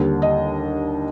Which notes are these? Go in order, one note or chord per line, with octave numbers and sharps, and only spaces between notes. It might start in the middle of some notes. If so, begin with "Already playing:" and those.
Already playing: D#2 D3 G3
D#5